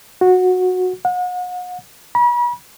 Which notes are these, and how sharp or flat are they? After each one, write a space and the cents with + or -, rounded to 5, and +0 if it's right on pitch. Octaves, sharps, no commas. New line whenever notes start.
F#4 -15
F#5 -40
B5 -40